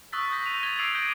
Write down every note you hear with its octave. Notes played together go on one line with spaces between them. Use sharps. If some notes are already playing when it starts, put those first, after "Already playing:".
C#6 D#6 E6 F#6 A6 B6
G6 A#6 B6
D#7 F7
G#6 A6 F7 G7
D6 E6 C7 D7 F7 F#7
D6 G6 A#6 D7 D#7 G7